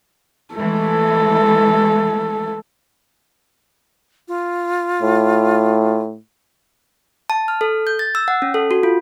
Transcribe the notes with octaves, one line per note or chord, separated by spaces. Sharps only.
E3 G#3 A3 A4
F4
A2
A5
F6
A4
G6
A6
E6
F#5
C#4
A4
F#4
F4